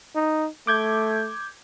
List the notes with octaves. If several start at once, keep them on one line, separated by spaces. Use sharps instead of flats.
D#4
A3 D6 G6 G#6